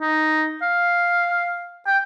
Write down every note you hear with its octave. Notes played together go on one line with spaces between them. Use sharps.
D#4
F5
G5